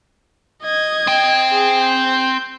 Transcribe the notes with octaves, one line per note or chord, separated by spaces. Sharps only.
D#5 G#6
C4 G5
G#4
G6